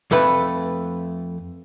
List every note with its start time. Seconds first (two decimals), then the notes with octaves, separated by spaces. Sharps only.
0.11 F2 A3 B4 B5